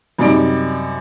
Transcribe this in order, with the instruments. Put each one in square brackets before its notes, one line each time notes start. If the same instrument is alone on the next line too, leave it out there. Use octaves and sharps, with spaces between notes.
[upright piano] F#2 C3 G3 D#4 D5 D7